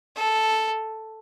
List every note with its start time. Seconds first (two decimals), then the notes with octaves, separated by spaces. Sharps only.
0.16 A4